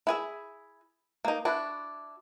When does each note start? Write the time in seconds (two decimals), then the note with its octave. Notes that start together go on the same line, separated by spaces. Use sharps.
0.07 E4 G#4 E5
1.25 A#3 D#4
1.45 D4 E4 F#4